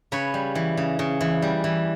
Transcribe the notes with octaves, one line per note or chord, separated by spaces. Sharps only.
C#3 B4 C#5
G3
E3
C#3
C#3
E3
G3
E3